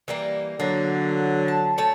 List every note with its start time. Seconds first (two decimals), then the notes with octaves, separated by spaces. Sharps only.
0.08 E3 G3 A#3
0.60 D3 F#3 A#3
1.48 A5
1.78 A3 C#5 A5